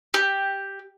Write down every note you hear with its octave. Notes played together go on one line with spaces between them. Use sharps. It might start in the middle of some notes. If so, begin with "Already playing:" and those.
G4